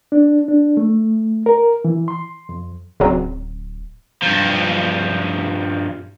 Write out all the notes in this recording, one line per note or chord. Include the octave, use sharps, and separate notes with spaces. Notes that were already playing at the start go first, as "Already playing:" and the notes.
D4
D4
A3
A#4
E3
C6
F2
D1 C#3 F#3 C4
G2 F3